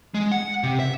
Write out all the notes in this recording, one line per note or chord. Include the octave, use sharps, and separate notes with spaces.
G#3
F#5
C3
E5